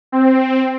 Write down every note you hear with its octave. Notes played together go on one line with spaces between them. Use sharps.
C4